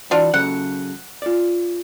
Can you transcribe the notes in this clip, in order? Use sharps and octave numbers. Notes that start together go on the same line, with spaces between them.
E3 D4 F4 F#4
C#3 F#3 A4 F#5
F4 D5